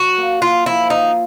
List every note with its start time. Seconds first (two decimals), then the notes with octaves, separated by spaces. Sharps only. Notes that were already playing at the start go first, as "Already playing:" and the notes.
Already playing: F#3 F#4
0.18 A#3
0.42 A#3 F4
0.66 F3 E4
0.90 F3 D#4